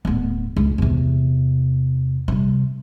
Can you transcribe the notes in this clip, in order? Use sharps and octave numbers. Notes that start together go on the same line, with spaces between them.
D1 B3
C#2
E2 C3
C3 G3